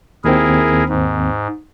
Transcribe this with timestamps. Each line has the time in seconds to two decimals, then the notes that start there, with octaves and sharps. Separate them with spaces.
0.24 D#2 D#3 C4 E4 G#4 A#4
0.89 G#2